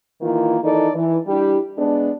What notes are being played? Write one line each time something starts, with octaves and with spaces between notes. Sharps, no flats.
D#3 E3 A#3 F4
D#3 E3 D#4 A4 D5
E3
G3 D4 E4 G4
G#3 B3 D4